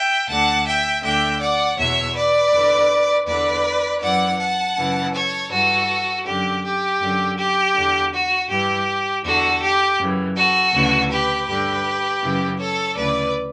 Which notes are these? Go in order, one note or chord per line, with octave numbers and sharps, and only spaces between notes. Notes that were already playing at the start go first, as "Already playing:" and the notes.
Already playing: E5 G5
D2 D3 F#5 A5
E5 G5
D2 D3 E5 G5
D5 F#5
E2 B2 C#5 E5
B4 D5
E2 D3
E2 D3 B4 D5
F#2 E3 D5 F#5
F#5 A5
F#2 C#3 E3
A4 C#5
G2 E3 F#4 A4
F#2 D3 G4
G4
F#2 D3
G4
E2 D3
F#4
G2 E3 G4
E2 D3 F#4 A4
G4
F#2 C#3 E3
F#4 A4
D2 C#3 E3
G4 B4
G2 D3 G4 B4
F#2 C#3 E3
A4 C#5
D2 C#3 E3 B4 D5